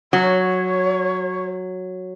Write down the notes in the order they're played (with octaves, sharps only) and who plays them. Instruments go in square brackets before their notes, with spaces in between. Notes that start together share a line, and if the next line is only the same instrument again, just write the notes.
[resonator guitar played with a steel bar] F#3 [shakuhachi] C#5